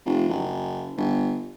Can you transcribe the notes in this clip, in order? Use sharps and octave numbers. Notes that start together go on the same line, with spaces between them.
F1
F#1
G1